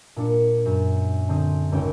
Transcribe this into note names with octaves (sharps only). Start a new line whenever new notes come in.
A#2 D4 C#7
F#2
D3 C4 C6 D#6
G#1 C#2 C#4 C#5 G5 D7